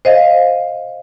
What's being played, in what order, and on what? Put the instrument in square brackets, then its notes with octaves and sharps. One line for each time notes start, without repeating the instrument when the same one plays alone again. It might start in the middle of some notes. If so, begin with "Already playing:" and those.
[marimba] C5 D#5 F5